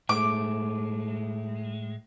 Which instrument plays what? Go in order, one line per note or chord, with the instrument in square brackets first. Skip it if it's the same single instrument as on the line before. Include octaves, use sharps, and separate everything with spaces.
[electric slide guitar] A2 G#3 A3 [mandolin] D6